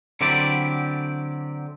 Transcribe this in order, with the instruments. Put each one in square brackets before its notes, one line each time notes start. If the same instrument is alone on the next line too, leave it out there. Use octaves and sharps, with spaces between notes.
[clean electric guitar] D3 F#3 C4 E4 G4 D5